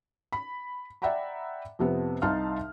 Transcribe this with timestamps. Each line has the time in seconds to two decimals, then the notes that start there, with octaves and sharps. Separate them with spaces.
0.32 B5
1.02 D5 E5 F#5 G5 A#5 B5
1.79 F2 C3 B3
2.22 C2 D#4 F5 A5 C6 F6